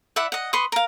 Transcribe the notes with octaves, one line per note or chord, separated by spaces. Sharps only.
E4 D5 E5 F#5
D#5 F#5
B4 C6 C#6 D#6
A#4 F5